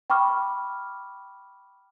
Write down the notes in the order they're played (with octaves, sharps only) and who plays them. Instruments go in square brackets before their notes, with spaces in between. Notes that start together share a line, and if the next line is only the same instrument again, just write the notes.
[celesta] G5 B5 C#6 D6 F6